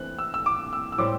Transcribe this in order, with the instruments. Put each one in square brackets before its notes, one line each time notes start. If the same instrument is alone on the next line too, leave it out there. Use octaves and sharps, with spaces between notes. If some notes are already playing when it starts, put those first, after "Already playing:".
Already playing: [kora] E3 A3 C4 [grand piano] F#6
[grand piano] E6
E6
D6
E6
E6
[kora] A2 G3 C4 [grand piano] D6